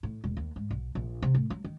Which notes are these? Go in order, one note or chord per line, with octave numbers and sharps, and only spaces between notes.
A2
E1
D#2
G#2
B1
A#1
C3
A2
F#3
D#3